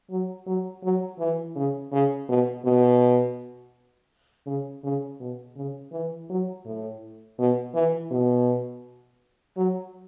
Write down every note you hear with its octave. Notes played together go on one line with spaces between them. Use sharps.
F#3
F#3
F#3
E3
C#3
C#3
B2
B2
C#3
C#3
B2
C#3
E3
F#3
A2
B2
E3
B2
F#3